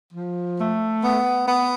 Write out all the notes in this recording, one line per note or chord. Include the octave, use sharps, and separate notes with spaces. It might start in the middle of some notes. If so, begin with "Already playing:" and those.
F3
A3
B3
B3